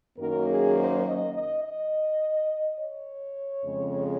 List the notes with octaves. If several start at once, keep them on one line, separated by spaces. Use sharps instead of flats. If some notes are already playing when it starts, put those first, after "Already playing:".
F#2 D#3 F#3 A#3 A#4
G#4
C5
D#5
D#5
D#5
C#5
F2 C#3 G#3